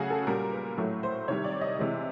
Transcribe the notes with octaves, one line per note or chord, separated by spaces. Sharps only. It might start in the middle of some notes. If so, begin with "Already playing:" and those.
Already playing: C#3 F#3 A3 F#4 G#4
A4
A#2 G3 A#4
B4
A2 F#3 A3
C5
C3 D#3 G3 C#5
D5
D#5
C3 E3 G#3